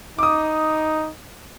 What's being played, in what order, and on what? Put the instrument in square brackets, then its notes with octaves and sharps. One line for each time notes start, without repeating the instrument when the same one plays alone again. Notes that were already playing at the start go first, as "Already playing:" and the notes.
[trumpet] D#4 [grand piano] D6 D#6